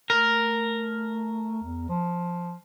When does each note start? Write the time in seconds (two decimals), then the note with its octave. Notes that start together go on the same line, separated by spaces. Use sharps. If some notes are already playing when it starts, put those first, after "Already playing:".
0.10 A3 A#4
1.63 E2
1.89 F3